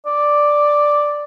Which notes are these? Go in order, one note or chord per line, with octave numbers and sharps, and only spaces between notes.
D5